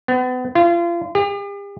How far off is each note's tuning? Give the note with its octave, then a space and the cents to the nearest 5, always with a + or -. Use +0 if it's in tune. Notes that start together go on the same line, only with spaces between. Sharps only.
B3 +35
F4 -30
G4 +45